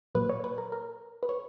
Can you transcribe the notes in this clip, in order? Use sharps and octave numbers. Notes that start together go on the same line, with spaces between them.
A#2 F#3 A#3 B4
C#5
B4
A#4
A#4
B4
C#5